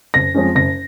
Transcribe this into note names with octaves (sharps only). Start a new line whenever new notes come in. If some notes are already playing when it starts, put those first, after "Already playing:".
F#1 A#6
F2 F3 G#3 C#4
F#1 A#6